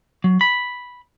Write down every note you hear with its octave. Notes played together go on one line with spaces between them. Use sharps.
F#3
B5